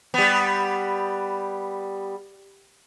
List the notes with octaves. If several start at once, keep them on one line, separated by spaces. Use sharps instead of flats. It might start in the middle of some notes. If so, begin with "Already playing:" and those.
G3 B3